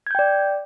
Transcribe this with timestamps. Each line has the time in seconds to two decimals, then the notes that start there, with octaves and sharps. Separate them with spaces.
0.07 G#6
0.11 G6
0.15 G5
0.19 D5